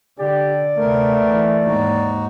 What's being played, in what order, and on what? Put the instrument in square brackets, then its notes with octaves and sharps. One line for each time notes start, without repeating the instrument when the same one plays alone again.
[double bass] D3 [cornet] G4 [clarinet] D5
[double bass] D2 C3 [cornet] A3 [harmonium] B3 A#4
[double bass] E3
[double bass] D#2 G#2 [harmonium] D#4 F#4